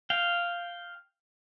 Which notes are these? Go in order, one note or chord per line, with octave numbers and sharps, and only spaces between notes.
F5 G5